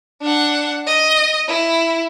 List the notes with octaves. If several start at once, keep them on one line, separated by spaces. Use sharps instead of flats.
D4 F#5
D#5
E4